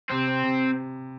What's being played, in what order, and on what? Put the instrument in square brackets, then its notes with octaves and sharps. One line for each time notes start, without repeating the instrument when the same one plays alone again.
[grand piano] C3 [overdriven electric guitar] C4
[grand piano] C3
C3